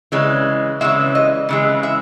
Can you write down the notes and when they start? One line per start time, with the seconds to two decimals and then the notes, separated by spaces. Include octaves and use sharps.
0.12 C#3 E3 G#3
0.81 C#3 E3 G#3 E5
1.15 D#5
1.49 C#3 E3 G#3
1.83 E5